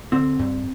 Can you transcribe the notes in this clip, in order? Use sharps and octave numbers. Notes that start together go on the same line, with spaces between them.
D3 C4
G2